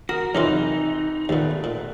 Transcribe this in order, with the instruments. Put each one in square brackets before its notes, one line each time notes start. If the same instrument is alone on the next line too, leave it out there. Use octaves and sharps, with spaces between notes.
[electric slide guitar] F#4 [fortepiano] A#4 [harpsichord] D#6
[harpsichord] F#2 F#3 F4 [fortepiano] C3 E3 [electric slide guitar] D#4
[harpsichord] D#2 A#2 [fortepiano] A3 B3
[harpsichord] A#2